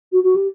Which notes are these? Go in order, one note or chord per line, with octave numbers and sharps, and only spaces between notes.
F#4
F#4
G4